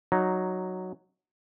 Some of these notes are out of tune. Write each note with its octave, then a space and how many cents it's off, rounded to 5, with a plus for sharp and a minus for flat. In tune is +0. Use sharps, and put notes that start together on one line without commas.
F#3 +0 D#4 -5